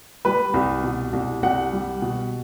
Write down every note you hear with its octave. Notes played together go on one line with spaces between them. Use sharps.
G3 B4
C2
B2
C2
C2 F#5
G3
B2